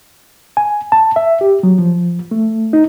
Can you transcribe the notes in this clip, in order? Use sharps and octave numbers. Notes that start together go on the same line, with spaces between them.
G#5
A5
E5
G4
F#3
F3
A3
D#4